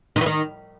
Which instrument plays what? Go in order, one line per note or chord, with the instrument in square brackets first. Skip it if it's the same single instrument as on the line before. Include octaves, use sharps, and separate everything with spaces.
[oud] D#3
E3
D#3